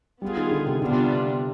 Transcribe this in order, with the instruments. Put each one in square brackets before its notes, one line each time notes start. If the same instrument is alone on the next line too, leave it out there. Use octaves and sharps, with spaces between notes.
[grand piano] G3 [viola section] B3 F4 G#4
[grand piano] D#3
D3
C3
[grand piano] D3 [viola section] G3 B3 D4 F4
[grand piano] C3